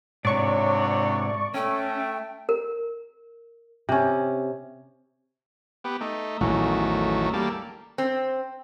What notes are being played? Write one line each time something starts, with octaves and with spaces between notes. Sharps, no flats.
A1 G#2 C3 F#3 D4 C#5 D5 C#6
A3 C#4 G5
A#4
C3 C#4
B3 G4
A3 D#4
A1 E2 D#3 F#3 A3
G3 A#3 A4
C4